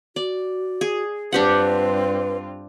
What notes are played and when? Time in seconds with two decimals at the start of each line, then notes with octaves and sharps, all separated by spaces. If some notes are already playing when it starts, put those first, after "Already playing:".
0.16 F#4 D5
0.81 G#4
1.32 G2 C4 D4 F4 G4 B4 F#5